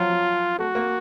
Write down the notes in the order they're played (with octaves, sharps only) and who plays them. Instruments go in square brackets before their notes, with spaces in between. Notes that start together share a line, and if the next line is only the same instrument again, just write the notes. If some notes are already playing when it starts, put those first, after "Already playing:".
Already playing: [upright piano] F3 F#3 [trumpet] F4
[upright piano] F#3
[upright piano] A3 [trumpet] F#4
[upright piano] A#3